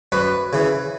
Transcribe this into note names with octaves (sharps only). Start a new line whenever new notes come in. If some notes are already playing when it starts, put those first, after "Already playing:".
F#2 B4
C#3 E3